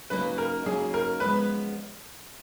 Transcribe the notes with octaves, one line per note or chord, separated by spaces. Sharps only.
C#3 F#3 A#3 D#4 B4
A#4
C#3 F#3 A#3 D#4 G#4
A#4
F#2 F3 G#3 B3 B4